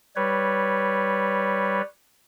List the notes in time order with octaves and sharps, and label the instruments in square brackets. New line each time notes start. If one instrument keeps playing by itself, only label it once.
[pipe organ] G3 B4 C#5